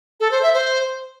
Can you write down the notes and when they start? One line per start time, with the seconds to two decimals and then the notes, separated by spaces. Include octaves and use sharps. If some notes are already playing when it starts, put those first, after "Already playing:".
0.20 A4
0.31 C5
0.43 E5
0.54 C5